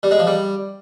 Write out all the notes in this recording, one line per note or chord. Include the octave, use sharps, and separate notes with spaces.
G3
G#3
F3
G3